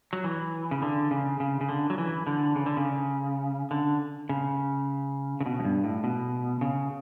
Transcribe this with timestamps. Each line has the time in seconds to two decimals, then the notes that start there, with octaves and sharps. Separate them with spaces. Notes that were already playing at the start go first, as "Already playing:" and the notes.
0.13 F#3
0.24 E3
0.71 C#3
0.82 D3
1.11 C#3
1.40 C#3
1.61 C#3
1.69 D3
1.90 F#3
1.98 E3
2.27 D3
2.56 C#3
2.66 D3
2.77 C#3
3.71 D3
4.29 C#3
5.40 C#3
5.46 B2
5.60 F#2
5.65 G2
5.84 A2
6.04 B2
6.61 C#3